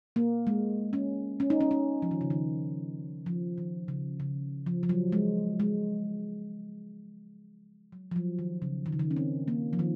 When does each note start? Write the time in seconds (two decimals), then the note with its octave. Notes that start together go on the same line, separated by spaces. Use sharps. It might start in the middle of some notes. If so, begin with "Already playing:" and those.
0.16 A#3
0.47 G#3
0.93 C#4
1.40 C#4
1.50 D#4
1.61 C#4
1.71 C#4
2.02 F3
2.11 D#3
2.21 C#3
2.30 D#3
3.26 F3
3.58 D#3
3.88 C#3
4.20 C#3
4.66 F3
4.83 F3
4.89 F#3
5.12 G#3
5.60 G#3
7.92 F#3
8.11 F3
8.16 F#3
8.39 D#3
8.62 C#3
8.86 D#3
8.93 C#3
8.99 D#3
9.11 C#4
9.17 C4
9.48 A#3
9.73 F3
9.79 D#3